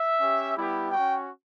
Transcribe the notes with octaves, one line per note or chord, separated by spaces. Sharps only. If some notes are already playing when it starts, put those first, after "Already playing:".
Already playing: E5
C#4 G4
G3 B3 E4 G4
C#4 F#4 G5